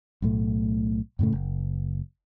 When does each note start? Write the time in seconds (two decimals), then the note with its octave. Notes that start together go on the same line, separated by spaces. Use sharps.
0.22 B1 A2 A3
1.19 F#2 A2 C#3 A3
1.33 F#1